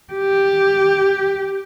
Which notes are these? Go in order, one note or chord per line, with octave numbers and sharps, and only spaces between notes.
G4